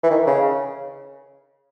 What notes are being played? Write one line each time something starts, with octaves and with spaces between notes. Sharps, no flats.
E3
D#3
C#3